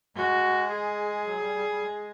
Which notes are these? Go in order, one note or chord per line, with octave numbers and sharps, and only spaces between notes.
G#3 F#4
G#4
F#3
G3
G3
G3
G#3